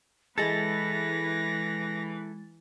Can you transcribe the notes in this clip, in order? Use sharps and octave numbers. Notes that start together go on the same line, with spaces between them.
E3 G#3 E4 A4 B4 A6 A#6